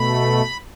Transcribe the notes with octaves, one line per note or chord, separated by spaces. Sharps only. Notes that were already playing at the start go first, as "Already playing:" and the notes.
Already playing: B2 A3 B5